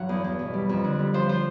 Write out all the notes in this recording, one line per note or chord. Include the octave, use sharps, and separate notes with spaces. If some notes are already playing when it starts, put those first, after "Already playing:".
Already playing: G2 F#3 F#5
E2
E2
B2
G3
F2
D3
G3
F3 C5
F3 C5